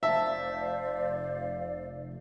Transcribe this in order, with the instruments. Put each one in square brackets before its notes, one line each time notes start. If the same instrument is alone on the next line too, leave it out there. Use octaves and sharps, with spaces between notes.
[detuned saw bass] F1 [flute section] C5 D5 F5 [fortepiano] E5 A5